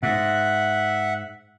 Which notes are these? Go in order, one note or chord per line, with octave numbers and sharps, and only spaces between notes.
G#2 E5 F#5